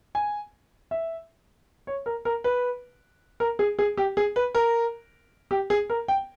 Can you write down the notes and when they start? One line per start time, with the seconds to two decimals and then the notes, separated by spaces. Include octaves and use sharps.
0.15 G#5
0.91 E5
1.87 C#5
2.06 A#4
2.25 A#4
2.44 B4
3.40 A#4
3.59 G#4
3.79 G#4
3.97 G4
4.17 G#4
4.36 B4
4.55 A#4
5.51 G4
5.70 G#4
5.90 A#4
6.08 G5